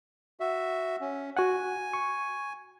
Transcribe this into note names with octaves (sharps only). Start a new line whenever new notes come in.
F#4 E5
C#4
F#4 F#5 G#5
C#6